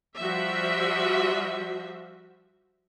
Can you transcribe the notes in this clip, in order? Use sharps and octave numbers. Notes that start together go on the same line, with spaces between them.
F3 G3 F#4 E5